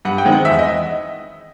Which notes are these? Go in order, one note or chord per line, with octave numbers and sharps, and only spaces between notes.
G2 F#5
G5
D#3 G#3 C4
F#5
E2 E5
D#5